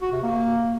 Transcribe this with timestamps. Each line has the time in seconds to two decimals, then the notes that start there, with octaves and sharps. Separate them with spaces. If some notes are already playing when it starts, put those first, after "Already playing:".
0.01 F#4
0.12 C3
0.23 A#3